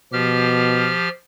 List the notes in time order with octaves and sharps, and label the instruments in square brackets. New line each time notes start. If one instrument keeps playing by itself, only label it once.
[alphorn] B2 [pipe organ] F3 G4 F6